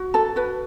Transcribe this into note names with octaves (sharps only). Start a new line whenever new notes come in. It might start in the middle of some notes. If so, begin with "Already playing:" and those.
Already playing: F#4
A4 A5
F#4 B4